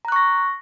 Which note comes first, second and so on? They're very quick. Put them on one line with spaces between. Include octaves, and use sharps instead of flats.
A#5 F#6 C#6 A#6